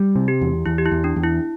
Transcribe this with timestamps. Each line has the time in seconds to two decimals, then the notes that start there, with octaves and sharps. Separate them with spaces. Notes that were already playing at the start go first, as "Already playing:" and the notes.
Already playing: G3
0.16 C3
0.28 G4
0.41 E2
0.66 E2 E4
0.78 G4
0.85 E4
0.92 E2
1.04 D4
1.16 E2
1.24 E4